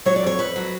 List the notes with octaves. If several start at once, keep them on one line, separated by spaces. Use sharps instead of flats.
F#3 C#5
D5
F2 C#5
F2 B4
F#3